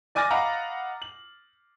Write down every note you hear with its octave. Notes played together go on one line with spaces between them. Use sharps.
D5 G#5 D6 F6 A6 A#6
D#5 F5 F#5 A#5 B5 D6
F#7